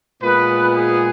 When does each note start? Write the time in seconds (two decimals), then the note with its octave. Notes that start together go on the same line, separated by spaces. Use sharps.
0.22 A#2 G#3 B3 B4
0.73 G#4